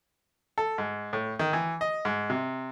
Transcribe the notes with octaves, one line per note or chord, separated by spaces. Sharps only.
A4
G#2
A2
D#3
E3
D#5
G#2
C3